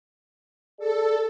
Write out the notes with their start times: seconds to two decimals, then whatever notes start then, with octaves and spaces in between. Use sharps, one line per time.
0.79 G#4 A4 D5